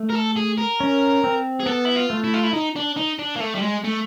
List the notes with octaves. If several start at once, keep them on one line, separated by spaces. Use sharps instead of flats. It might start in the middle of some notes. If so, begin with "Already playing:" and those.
Already playing: A3
A#4
A4
G#4
A#4
C#4
C4
G#4
B3 A4
E4
F4
A3
E4
F4
E4
D#4
D4
D#4
D4
A#3
A3
G3
G#3
A3